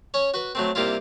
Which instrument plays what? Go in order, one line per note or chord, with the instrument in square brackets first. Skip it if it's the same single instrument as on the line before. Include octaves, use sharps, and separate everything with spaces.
[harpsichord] C#4 C#5
F#4 B4
F#3 A3 C4
C3 G3 A#3 E4 F4